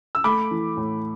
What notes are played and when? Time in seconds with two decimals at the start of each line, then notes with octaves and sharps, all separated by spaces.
0.15 E6
0.24 A3 B5 D6
0.51 E3
0.77 A2